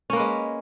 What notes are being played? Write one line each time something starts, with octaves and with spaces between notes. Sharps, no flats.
G#3 A#3 C#4 B4